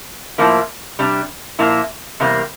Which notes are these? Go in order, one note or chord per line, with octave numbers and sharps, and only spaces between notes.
A2 F3 A#3 E4
C3 G3 D4
A#2 F3 A#3 E4
E2 C3 G3 A#3